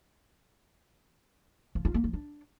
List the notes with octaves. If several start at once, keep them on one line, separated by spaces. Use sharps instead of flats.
F3
F4
A#3
F3
D4